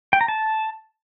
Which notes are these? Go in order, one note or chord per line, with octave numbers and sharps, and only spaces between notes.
G5
A#5
A5